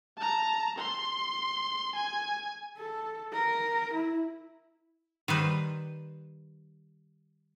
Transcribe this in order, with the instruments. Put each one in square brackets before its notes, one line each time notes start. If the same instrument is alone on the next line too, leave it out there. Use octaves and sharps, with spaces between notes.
[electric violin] A5 A#5
C6
G#5
[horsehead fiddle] A4
A#4
E4
[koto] D#3 G3 B4 C5